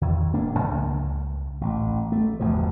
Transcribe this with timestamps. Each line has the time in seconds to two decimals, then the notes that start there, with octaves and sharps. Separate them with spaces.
0.01 E2 D#3 E3
0.33 D1 A#3 D4
0.59 C#2
1.61 A1
2.12 A3
2.40 G1 E2 B2 F3